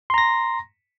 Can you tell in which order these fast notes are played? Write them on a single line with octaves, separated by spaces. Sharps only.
C6 A#5 A#6